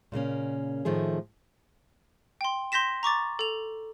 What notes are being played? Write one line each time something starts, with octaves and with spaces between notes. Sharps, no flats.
A#2 C#3 A#3 C#4
A2 D#3 F3 A3 G#4
G5 C6
C6 G6 A#6 B6 E7
A#5 C#6 D6 A6
A4 F7